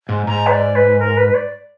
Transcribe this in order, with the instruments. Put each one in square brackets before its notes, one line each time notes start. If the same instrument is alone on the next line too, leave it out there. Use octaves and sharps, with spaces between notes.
[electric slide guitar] G#2
[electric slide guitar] G#2 [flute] A#5
[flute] B4
D5
B4
A#4
B4
B4
D5